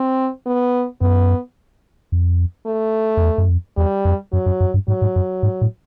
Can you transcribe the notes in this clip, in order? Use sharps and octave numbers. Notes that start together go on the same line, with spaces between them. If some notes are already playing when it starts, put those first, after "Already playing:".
Already playing: C4
B3
F#2 B3
F2
A3
F2
E2
F#2
F2
E2 G3
F2
F#2 F#3
F#2
F#2
G2
G#2 F#3
G#2
F#2
G#2
A2